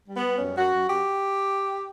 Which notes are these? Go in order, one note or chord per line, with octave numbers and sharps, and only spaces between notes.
G3
B3
G3
F#2 C#4
F#2 F#4
F#2
F#2 G4